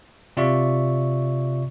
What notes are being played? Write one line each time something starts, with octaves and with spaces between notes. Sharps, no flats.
C3 F4 D5 E5 C#6